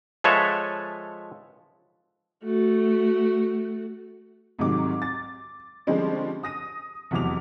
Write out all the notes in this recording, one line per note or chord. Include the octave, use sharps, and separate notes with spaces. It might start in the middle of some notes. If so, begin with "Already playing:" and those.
F3 G#3 A4 B4 C#5 E5
A3 F#4
C2 G#2 C3 D#3 F#3 D6
A6
D3 F3 G3 G#3 C4 C#4
D#6 A#6 D#7
F1 E2 E3 F#3 D6 F7